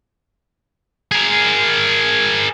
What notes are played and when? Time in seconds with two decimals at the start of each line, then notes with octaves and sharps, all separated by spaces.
1.12 G#4 A#4